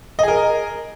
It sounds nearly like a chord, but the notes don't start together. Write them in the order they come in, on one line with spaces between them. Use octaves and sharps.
D#5 G#4 A#4